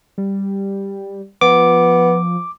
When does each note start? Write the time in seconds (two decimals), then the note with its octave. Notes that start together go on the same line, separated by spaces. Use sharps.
0.18 G3
1.41 F3 B3 D6